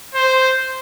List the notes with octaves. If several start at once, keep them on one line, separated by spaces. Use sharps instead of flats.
C5